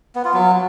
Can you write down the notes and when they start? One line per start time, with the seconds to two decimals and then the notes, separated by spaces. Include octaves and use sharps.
0.15 B3
0.25 F4
0.34 F#3